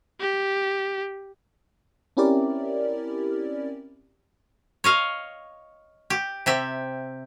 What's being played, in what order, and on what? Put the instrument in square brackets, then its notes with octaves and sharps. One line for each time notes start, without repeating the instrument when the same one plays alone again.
[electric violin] G4
[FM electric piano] C4 C#4 E4 G4 A#4 D5
[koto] C#5 D#5 F5
G4
C3 G4 E5